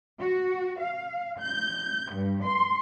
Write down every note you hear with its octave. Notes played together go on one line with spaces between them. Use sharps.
F#4
F5
G6
G2
C6